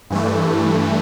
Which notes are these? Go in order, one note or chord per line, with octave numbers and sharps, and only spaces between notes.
G2 E3 A3